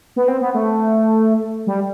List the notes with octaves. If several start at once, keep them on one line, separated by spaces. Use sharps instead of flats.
B3
C4
B3
A3
G3